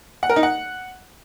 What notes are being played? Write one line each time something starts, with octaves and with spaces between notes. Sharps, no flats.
F#5
A#4
D#4
F#5